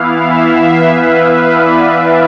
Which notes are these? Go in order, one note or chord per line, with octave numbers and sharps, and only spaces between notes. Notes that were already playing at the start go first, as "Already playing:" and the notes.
Already playing: E3 B3 E4 F5
E5
B4
B4
D5